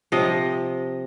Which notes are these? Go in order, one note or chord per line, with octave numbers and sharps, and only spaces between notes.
C3 F3 D#5